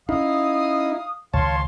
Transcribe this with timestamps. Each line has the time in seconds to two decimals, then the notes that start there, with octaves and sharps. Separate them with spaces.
0.09 C#4 D#4 E4 F5 D#6
1.34 C#2 D#3 C#5 F5 A5 C6